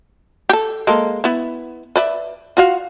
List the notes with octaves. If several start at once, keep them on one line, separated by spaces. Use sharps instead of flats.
G4 A4
G#3 A#3 A4
B3 E4
B4 D5 E5
F4 F#4 F5